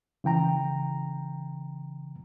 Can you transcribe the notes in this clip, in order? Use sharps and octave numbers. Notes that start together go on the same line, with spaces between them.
C#3 E3 G5 A#5